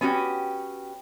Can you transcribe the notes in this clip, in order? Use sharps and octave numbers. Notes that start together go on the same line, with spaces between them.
B3 C#4 F#4 G4